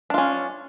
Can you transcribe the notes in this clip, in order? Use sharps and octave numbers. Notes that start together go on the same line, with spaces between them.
C#4 D4 F4